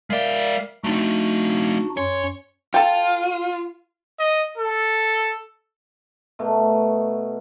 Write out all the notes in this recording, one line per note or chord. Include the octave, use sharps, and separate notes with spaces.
G#3 A#4 D5 E5 F5
A3 C4 D4 D#4 F#4
F#2 C#4 C#5 C6
F4 A4 G5
D#5
A4
B2 A3 A#4